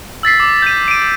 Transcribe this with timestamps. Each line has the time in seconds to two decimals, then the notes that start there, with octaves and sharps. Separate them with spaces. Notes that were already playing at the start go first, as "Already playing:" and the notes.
0.23 E6 A6 B6 C7
0.40 D6
0.62 G6 A6 D#7
0.88 D7 D#7